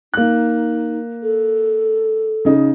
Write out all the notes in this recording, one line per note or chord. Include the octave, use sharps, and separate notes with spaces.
A#3 D#4 F#6
A4
C#3 D#4